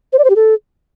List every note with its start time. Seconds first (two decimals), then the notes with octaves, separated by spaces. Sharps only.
0.13 C5
0.18 D5
0.24 C5
0.30 G4
0.36 A4